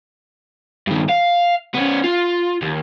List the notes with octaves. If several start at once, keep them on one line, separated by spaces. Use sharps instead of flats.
G2 D#3
F5
B3 C#4
F4
D#2